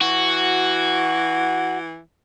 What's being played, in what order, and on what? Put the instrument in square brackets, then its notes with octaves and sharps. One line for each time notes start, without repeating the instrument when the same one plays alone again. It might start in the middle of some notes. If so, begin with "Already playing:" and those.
[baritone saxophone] E3 [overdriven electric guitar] F#4